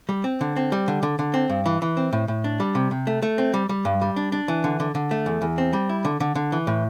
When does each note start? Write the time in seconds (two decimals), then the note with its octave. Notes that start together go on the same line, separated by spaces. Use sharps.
0.09 G3
0.24 C4
0.41 D3
0.56 C4
0.72 G3
0.88 D3
1.03 D3
1.19 D3
1.34 C4
1.50 G2
1.66 E3
1.82 E3
1.97 C4
2.13 A2
2.28 A2
2.44 D4
2.60 G3
2.75 C3
2.91 C3
3.07 A3
3.22 A3
3.38 C4
3.54 G3
3.69 G3
3.85 G2
4.01 G3
4.16 D4
4.32 D4
4.48 E3
4.64 D3
4.80 D3
4.95 D3
5.11 A3
5.26 E2
5.42 E2
5.58 C4
5.73 G3
5.89 E4
6.05 D3
6.20 D3
6.35 D3
6.52 E3
6.67 A2